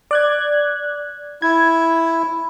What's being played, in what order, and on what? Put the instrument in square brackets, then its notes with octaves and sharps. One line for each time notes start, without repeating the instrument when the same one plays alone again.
[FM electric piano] D5 F#6 G#6
[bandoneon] E4 [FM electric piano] G#6